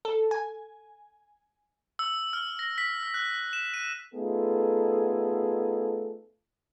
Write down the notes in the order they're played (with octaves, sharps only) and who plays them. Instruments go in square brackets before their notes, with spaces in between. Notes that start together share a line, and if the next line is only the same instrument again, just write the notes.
[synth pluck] A4
G#5
[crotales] E6
F6
A#6
B6
F6
F#6
E7
D#7
[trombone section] A3 B3 D#4 F4 G#4 A4